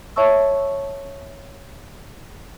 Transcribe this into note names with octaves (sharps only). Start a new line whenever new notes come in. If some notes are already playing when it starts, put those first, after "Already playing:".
C#5 E5 A5 C#6 E6